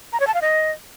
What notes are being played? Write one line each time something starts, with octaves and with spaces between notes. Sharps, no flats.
A#5
C#5
A5
F5
D#5